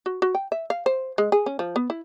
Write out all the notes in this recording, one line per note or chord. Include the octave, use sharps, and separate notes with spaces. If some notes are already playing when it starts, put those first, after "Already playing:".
F#4
F#4
G5
E5
F5
C5
G#3
G#4
C#4
F3
B3
E4